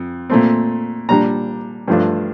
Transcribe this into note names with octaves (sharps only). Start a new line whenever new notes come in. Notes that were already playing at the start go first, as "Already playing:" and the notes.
Already playing: F2
A#2 A3 C4
A#2 G3 D4 A#5
G2 F3 A3 D4